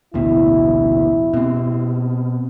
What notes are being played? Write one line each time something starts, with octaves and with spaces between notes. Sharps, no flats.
A1 D2 B2 E4
B2 C4